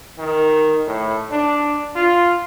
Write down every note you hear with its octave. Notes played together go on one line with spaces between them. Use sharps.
D#3
A2
D4
F4